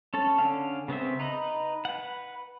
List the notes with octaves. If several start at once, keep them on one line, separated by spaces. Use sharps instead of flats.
C#4 A4 A5
D3 C#4 F5
C#3 B3 C4 E5
D#4 B4 D#5
B4 F#5